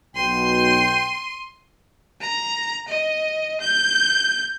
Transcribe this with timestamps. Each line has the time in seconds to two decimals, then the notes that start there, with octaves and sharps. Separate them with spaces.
0.15 B1 B2 G5 C6 D#7
2.21 A#5
2.88 D#5
3.61 G6